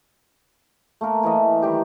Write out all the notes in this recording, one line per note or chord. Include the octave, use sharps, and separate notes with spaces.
A3 A#3 A#4
E3 A3 D#5
D#3 G3 G4